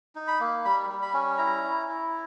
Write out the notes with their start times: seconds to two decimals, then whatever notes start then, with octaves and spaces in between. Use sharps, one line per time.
0.15 D#4
0.28 B5
0.40 A#3
0.65 G3 B5
0.89 G3
1.02 B5
1.14 C#4
1.38 E4 A#5
1.64 E4
1.88 E4